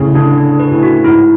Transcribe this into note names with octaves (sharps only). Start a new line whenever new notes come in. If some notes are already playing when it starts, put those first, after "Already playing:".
Already playing: A2 C#3
D3 D4
D4
B4
A2
F#4
G#2 E4